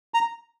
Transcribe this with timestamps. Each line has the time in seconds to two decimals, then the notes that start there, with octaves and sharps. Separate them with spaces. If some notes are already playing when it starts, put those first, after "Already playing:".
0.14 A#5